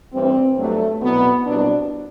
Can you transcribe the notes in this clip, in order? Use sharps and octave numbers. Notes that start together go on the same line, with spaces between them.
A1 G2 E3 C4
G1 G2 F#3 A3
C2 B2 F#3 B3
C2 B2 F#3 D4